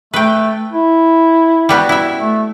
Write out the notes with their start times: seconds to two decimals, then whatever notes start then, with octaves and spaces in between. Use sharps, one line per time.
0.14 A3 B4 G5
0.73 E4
1.69 G3 B3 F#4
1.89 E4 E5
2.19 A3